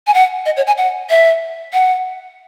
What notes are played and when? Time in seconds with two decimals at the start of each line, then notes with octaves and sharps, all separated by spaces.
0.07 G#5
0.14 F#5
0.46 D#5
0.57 C#5
0.67 G#5
0.78 F#5
1.10 E5
1.73 F#5